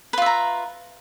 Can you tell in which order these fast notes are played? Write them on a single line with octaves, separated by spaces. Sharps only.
B4 F4 E5 A#5